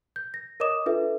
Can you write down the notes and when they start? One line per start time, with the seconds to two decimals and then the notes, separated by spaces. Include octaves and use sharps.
0.16 G6
0.34 A#6
0.60 A#4 C#5 D#5 D6 D#6 E7
0.86 D4 F4 A4 B4 E5